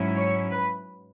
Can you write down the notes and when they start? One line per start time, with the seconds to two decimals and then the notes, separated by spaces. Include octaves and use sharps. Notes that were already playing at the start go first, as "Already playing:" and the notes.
Already playing: G#2 F#3 C#4 E4
0.16 C#5
0.51 B4